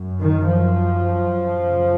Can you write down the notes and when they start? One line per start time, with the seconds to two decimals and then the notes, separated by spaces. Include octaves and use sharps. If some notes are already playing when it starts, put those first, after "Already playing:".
Already playing: F#2
0.19 D#3
0.47 F3
1.61 F#2 C#3